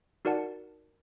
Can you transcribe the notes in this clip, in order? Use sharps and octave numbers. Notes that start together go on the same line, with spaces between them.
D#4 F#4 A#4 D5 F#5 A5